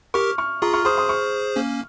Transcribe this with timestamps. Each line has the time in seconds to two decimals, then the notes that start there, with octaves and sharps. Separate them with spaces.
0.14 G4 A#4 C#6 F6
0.38 C#6 F6
0.62 F4 G#4 A#5 C#6
0.73 C#6 F6
0.85 G#4 C5 C6 D#6
0.98 C6 D#6
1.09 C#6 F6
1.56 A#3 C#4